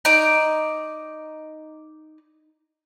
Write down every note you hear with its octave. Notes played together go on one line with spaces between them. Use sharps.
D#4 D5